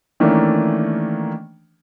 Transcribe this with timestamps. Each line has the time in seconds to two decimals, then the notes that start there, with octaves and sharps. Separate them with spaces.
0.20 D#3 E3 A3 A#3 C#4 D4